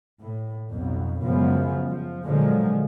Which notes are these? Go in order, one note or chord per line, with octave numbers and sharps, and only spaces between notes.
A2
B1 F2
F#2 C#3 F3 G#3 B3
F3
A#2 D3 F3 F#3 G#3